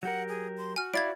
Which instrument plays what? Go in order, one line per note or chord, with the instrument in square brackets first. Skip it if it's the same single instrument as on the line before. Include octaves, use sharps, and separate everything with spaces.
[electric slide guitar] F#3 G4 A#4 [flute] F#5
[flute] G#4
C6
[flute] F#4 [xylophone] G#5 F6
[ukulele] E4 D5 F5 [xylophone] G#6 A6 D7